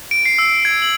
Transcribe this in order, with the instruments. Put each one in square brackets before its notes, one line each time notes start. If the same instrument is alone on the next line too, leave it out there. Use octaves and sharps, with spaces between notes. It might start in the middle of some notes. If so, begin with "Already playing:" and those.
[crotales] D7
C7
E6
G#6
F#7